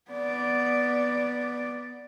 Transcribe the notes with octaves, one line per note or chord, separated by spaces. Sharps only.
B3 D5